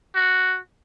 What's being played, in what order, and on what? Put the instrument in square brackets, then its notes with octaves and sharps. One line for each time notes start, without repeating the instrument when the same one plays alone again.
[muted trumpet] F#4